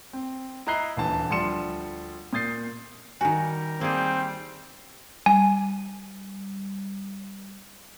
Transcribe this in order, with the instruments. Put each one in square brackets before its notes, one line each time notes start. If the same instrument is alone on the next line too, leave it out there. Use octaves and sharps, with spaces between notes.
[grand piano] C4
E4 D#5 A#5 F#6 C7 G7
D#1 D2 E3 A5
D2 F3 G3 C6 C#7 E7
A#2 D#6 G6 A6 C7
[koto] D#3 F#4 [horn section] G3 G4 A#4 [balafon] G#5
[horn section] G3 [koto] A#3 G#4 [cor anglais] C4
[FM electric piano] G3 [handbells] G#5